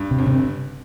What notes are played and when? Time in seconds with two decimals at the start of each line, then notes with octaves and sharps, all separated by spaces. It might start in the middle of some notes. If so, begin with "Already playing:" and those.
Already playing: G2
0.11 C3
0.19 G1
0.27 C3